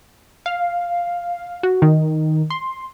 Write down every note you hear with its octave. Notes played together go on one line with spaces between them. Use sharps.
F5
F#4
D#3
C6